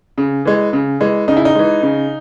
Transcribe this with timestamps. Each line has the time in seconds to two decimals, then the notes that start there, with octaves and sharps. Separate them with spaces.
0.18 C#3
0.45 E3 G#3
0.73 C#3
1.00 E3 G#3
1.28 C#3 D#4
1.37 E4
1.45 D#4
1.55 E3 G#3
1.83 C#3